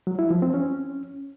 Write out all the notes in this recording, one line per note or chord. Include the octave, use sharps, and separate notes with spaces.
F#3
E4
F3
C4
C#4